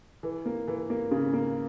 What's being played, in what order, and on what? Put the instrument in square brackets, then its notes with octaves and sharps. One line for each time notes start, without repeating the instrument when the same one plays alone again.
[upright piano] E3
A#3
E3
A#3
C#3
A#3